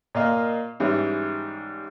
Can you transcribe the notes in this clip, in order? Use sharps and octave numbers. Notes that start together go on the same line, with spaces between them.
A#2 A#3 D#5 F5
G#2 E3 G3 C#4